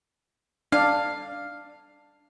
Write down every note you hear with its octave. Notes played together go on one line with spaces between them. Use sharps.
D4 F5